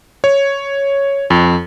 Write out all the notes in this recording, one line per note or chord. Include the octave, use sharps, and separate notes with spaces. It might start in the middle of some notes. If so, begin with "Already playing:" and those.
C#5
F2